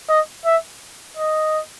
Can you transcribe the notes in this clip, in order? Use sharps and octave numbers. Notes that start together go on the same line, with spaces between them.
D#5
E5
D#5